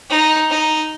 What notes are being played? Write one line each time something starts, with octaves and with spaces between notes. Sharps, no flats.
D#4
D#4